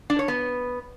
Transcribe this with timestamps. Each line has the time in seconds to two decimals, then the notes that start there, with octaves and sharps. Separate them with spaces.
0.10 D4
0.19 C#5
0.28 B3